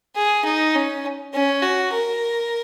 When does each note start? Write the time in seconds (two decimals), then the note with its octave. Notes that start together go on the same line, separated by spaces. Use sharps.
0.16 G#4
0.45 D#4
0.75 C#4
1.33 C#4
1.63 F#4
1.93 A#4